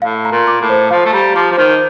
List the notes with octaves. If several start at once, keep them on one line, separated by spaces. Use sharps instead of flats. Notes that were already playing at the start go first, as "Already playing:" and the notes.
A2 F5
A#5
A#2
D6
A2
C5
F3 F5
A3
G3 A#5
F3 D6
F3
D#3 C5